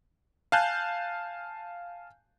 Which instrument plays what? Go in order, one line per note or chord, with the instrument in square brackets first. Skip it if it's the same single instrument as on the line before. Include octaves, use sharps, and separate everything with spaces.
[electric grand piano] F5 G#5 A5 F#6 G6